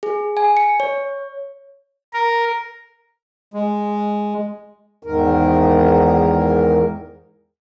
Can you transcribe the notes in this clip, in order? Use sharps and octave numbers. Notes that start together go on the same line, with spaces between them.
G#4
G#5
C#7
C#5
A#4
G#3
E2 G#2 D#3 A#4